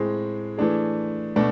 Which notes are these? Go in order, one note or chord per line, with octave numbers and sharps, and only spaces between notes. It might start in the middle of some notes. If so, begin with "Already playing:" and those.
Already playing: A2 G#3 C4 G#4
E3 A3 D4 G#4
B2 A3 D4